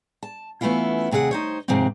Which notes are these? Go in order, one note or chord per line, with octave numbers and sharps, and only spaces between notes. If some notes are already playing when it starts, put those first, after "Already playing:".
A5
E3 A3 B3 C#4 E4 F4
D#2 C3 G#4 B4 F#5
D#4 C5 C#5
D#2 G#2 C3 F3 A#3 C4